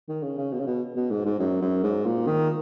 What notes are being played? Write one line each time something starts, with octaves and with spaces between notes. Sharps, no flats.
D#3
C#3
C#3
B2
C#3
B2
B2
G#2
G#2
F#2
F#2
G#2
A#2
D#3